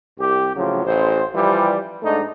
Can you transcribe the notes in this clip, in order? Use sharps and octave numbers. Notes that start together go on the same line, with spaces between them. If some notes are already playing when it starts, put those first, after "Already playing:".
C2 G4
A2 C#3 F3 F#3
A1 C5
E3 F3 G3
G#2 A3 D4 D#4